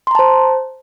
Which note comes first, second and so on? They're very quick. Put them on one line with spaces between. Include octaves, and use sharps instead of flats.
C6 A#5 A5 C5